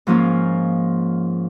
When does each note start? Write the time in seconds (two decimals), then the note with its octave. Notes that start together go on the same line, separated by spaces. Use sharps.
0.07 G#2 F3 A#3 C#4 F4